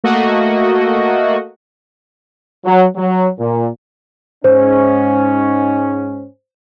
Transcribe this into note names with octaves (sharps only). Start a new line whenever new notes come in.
A3 A#3 F#4 D#5
F#3
F#3
A#2
G#2 C#4 C5